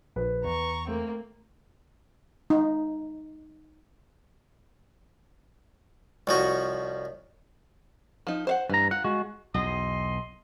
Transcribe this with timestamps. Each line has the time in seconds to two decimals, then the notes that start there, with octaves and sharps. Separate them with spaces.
0.16 A#1 B4
0.45 E2 A#5 C#6
0.88 A3 A#3 C4
2.50 D#4
6.27 C2 F3 F#4 C#5 D#5
8.27 F3 D#4
8.47 C5 F5 F#5
8.70 G2 E3 A#5
8.91 F4 F#5
9.04 G#3 F#4
9.54 B1 E2 D#5 C6